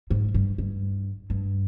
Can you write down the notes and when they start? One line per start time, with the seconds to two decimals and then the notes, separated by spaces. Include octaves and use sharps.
0.10 G#2
0.34 G2
0.58 G2
1.30 G2